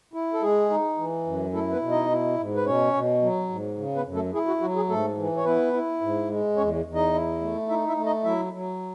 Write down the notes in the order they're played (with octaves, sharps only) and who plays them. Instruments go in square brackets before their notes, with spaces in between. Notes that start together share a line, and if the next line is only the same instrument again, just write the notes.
[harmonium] E4
A4
G#3 G#4
D#4
E3
F#2
A3 E4 A4
B3 B4
B2
D#4 D#5
E4
G#2
B4
B2 C#4 C#5
B2
F#3
G#2
C#3
B3 B4
F#2
A3 A4
E4 G#4
F#4
F#3 F#4
G#4
G#2 A3 A4
E3
C#5
B3 E4 B4
E4
G#2
G#3
E2 C#4 C#5
E2
D#4 D#5
E4
A3
D#4 E4 E5
E4 E5
A3
D#4 D#5
F#3 E4 E5
F#3